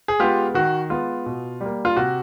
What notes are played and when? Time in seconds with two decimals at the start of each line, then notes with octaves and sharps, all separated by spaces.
0.08 G#4
0.20 G#3 B3 F4 G4
0.54 D#3 F#4
0.90 G#3 B3 F4
1.26 B2
1.61 G3 A#3
1.85 F4
1.97 C3 F#4